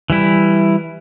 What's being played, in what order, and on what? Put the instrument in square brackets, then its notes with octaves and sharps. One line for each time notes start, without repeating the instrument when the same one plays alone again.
[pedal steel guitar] E3 G3 E4